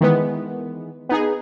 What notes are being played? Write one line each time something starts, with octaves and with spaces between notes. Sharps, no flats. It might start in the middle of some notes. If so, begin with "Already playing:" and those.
D#3 E3 G#3 B3
B3 D#4 G#4